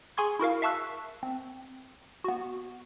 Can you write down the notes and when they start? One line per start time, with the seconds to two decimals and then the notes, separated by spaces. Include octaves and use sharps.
0.17 G#4 G#5 C6 C#6 G#6
0.39 E4 F#4 A#4 F5
0.62 E5 F5 A5 C#6 E6 F#6
1.23 C4
2.24 B3 F#4